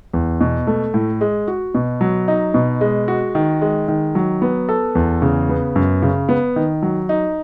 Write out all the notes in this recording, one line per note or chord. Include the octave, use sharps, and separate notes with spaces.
E2
B2
A3
A2
G#3
F#4
B2
F#3
D#4
B2
G#3
F#4
D#3
G#3
D#3
F#3
B3
A4
E2
C#3
B3
F#2
C#3
B3
D#3
F#3
D#4